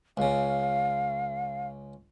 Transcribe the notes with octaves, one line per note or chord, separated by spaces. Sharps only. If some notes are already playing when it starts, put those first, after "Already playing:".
C#2 C#3 F5